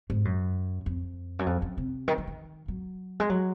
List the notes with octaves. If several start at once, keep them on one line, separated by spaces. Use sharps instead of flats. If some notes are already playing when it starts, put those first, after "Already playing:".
G#2
F#2
F2
F#2
F2
F#2
C3
D#3
F3
D#3
F#3
G#3
F#3